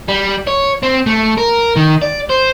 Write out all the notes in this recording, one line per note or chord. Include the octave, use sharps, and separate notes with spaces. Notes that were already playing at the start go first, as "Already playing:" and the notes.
G3
C#5
C4
A3
A#4
D#3
D5
C5